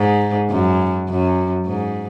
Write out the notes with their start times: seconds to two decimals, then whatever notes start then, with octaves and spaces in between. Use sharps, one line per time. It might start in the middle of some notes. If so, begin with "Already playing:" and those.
Already playing: G#2
0.51 F#2
1.09 F#2
1.66 G#2